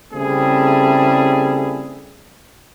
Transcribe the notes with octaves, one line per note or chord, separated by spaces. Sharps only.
C#3 G3 A3 C4 E4 G#4